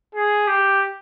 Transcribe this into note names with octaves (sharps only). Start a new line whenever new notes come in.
G#4
G4